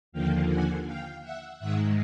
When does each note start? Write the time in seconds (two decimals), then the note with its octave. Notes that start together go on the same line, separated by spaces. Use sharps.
0.12 D#2 D3 F3 A#3 F5 G5
0.49 F#5 G#5
0.86 F5 G5
1.22 E5 F#5
1.59 G#2 D#3 G#3 E5 F#5